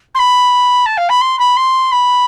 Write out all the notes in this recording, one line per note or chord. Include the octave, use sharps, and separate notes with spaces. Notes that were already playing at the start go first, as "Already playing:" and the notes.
C6
B5
A5
F5
B5
C6
B5
C6
B5